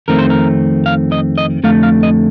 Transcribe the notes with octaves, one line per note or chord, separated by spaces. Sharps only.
F2 D#3 A3 C4 A#4
C5
A#4
F5
D#5
D#5
F2 D3 A3 F5
F5
D#5